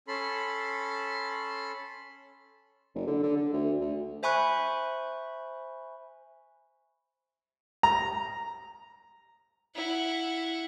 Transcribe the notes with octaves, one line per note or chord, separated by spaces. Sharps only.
C#4 A4 B5 C6
F#1
D3
D3
D3
D2
D2
C5 E5 G#5 B5 C#6 F#6
A#5
E4 F#5